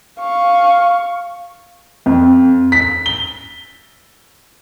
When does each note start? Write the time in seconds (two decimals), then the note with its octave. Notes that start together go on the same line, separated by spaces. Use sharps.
0.19 F5 C#6
2.06 F2
2.72 B6
3.06 G7